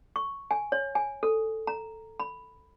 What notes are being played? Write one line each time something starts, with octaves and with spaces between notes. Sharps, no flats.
C#6
G#5
C#5
G#5
A4
A#5
B5